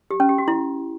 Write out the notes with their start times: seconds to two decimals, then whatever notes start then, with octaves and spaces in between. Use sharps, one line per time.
0.11 G4
0.20 C#4
0.29 G4
0.38 F#4
0.48 E4